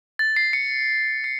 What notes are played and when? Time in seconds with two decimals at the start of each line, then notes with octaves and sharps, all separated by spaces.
0.19 A6
0.36 C7
0.53 C#7
1.24 C7